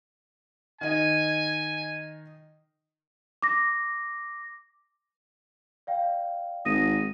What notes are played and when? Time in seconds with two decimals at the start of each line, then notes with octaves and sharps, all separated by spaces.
0.81 D#3 D#4 G#5
3.42 D6 A#6
5.87 D5 F5 G5
6.65 G#1 D#6 A#6 D#7